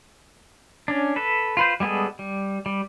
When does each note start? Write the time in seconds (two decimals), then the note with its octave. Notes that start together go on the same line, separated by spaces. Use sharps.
0.88 C#4 D4
1.16 A4 B4
1.57 F4 B4 C5
1.80 G3 G#3 B3 G#4 A4
2.19 G3
2.66 G3